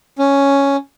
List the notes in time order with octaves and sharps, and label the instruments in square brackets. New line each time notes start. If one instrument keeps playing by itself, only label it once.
[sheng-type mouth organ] C#4